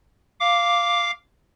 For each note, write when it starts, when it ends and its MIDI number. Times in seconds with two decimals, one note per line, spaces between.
0.40 1.11 77
0.40 1.11 86